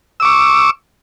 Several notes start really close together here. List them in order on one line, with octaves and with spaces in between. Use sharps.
E6 D6 C#6